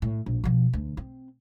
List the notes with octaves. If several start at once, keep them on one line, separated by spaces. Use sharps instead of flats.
A2
A#1
B2 F3
D2
C4